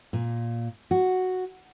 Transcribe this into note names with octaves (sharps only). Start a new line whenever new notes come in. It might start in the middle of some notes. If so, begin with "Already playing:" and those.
A#2
F#4